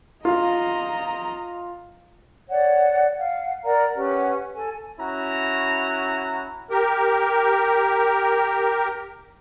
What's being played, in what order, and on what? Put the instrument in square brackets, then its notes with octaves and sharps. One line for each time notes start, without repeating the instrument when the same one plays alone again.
[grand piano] F4 F5 [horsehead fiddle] D#5 A#5
[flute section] C#5 D5 F#5
F5 F#5
A#4 D5 F#5 A#5
C#4 G4 B4 F#5
A4 G#5
[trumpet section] C#4 E4 F#4 A#5
[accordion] G4 A#4